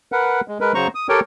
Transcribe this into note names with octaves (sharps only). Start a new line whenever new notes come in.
A#4 B4 F#5
G#3
G#3 A#4 B4
C#3 F#3 C5 A#5 C#6
D#6
G4 A4 A#4 C#5 G5